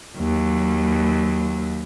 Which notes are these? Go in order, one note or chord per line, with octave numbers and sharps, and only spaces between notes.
D#2 F#3